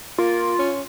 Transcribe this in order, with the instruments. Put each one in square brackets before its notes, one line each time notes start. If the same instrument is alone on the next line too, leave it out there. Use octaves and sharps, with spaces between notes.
[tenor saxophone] A#3 [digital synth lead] F4
[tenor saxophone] C#4